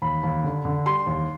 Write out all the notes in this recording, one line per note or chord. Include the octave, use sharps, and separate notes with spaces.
D#2 B5
D#2
D3
D3
G3 C6
D#2